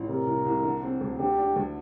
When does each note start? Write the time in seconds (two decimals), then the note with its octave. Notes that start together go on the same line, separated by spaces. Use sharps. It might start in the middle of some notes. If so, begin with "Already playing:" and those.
Already playing: A1
0.08 C3 A#4
0.27 C2
0.46 C2
0.64 D3
0.83 C4
1.01 D2
1.19 D3 G4
1.38 D4
1.56 D2